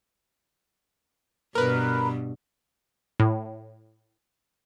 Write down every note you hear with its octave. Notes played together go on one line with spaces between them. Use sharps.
G2 B2 A#4 B4
A2